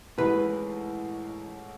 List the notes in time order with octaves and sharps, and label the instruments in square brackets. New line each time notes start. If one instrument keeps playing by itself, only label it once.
[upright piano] A1 A2 G#3 [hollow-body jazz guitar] B4